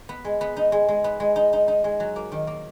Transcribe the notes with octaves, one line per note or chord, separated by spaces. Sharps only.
B3
G#3
B3
D#4
G#3
G#3
B3
G#3
D#4
D#4
D#4
G#3
F#3
A#3
D#3
A#3